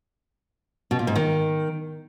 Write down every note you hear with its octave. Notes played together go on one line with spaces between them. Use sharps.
B2
A#2
G#2
D#3